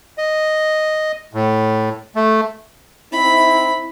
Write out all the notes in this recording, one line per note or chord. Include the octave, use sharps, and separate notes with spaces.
D#5
A2
A3
C4 D#4 E4 B5